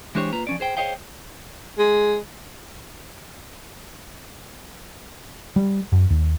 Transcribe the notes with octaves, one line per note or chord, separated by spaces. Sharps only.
E3 G#3 D4 G4 C5 C#5
A#3 F4 B4 A#5
F3 C#4 D5
G#4 C5 G5
G#4 C5 C#5 D#5 F5 G5
G#3
G3
F#2
D#2